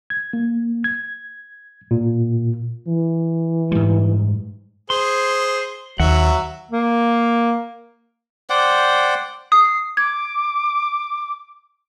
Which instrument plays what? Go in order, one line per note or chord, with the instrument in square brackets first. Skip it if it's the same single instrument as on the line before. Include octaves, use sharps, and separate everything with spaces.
[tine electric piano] G#6
A#3
G#6
A#2
[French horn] E3
[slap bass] G#2 G3
[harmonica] G#4 C5 [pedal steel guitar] C6
[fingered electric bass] D#2 [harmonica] F#3 E5 [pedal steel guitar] F#5
[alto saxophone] A#3
[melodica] C5 D5 F#5 G5
[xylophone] D#6 [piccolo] C7
[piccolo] D6 [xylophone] G#6